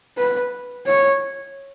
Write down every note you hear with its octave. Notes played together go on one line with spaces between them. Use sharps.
B4
C#5